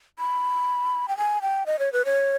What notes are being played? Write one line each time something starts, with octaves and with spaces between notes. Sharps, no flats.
B5
G5
G#5
G5
D#5
C#5
B4
C#5